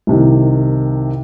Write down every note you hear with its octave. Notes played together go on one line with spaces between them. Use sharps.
C2 C3 D#3